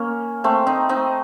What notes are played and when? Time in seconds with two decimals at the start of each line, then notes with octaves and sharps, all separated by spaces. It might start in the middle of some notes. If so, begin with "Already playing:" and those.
Already playing: A#3 C#4
0.44 A3 C4
0.67 C4 D#4
0.89 C4 D#4